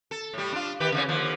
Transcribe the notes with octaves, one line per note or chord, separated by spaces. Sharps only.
A4
A2 G3
D4 F4
D#3 G4 B4
C#3 E3 C#4
D#2 D3 F3